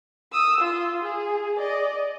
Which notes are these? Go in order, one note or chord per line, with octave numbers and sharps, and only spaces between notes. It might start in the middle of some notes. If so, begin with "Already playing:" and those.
D#6 E6
F4
G#4
D5 D#5